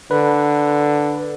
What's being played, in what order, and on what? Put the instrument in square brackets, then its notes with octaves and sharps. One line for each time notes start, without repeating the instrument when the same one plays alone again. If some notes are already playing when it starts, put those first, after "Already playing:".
[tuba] D3 [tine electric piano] B4